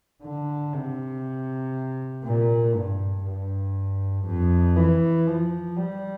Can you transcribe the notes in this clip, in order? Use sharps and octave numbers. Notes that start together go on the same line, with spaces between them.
D3
C3
A#2
G2
G2
F2
E3
F3
G3